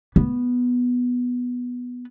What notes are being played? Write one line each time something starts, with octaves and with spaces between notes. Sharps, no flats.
B3